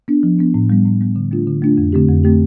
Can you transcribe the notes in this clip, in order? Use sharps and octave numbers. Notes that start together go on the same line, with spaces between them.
B3 D4
F3
B3 D4
A2
G3 B3
A2
G3 B3
D3
A3 D4 F4
D3
A3 D4 F4
F2
D3 A3 C4 G4
F2
D3 A3 C4 G4